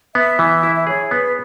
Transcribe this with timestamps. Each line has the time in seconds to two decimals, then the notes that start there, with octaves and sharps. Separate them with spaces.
0.15 B3 E5
0.39 E3
0.63 E4
0.76 E5
0.87 G#4 C#5
1.11 B3 B4